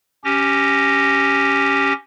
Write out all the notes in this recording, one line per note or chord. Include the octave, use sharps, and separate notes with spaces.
C#4 G4 A#6